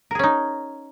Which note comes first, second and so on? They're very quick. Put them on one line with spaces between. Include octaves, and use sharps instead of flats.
A#4 G#4 C#4 D#4